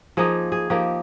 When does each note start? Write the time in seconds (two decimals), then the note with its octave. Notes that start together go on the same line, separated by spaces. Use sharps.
0.17 F3 A#3 D#4 G#4
0.52 G#4
0.70 F3 A#3 D#4 G4